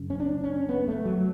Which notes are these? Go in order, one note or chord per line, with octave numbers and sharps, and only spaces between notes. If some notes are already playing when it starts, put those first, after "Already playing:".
Already playing: F#2 C#3
C#4
D4
C#4
B3
A3
F#3